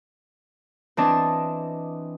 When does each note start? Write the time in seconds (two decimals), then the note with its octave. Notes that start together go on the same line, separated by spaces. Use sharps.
0.97 E3 C4 D4 D#5 A5